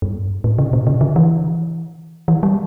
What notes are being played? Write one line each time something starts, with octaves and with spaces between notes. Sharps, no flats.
G2
A2
C#3
A#2
C#3
D3
E3
E3
G3